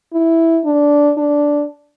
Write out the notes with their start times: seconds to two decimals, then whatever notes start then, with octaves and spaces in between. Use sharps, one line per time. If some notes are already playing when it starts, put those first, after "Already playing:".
0.13 E4
0.65 D4
1.17 D4